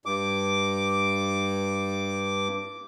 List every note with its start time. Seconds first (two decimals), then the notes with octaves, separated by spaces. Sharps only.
0.06 G2 D6